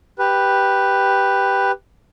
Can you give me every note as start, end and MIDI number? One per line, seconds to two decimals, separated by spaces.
0.19 1.71 67
0.19 1.71 71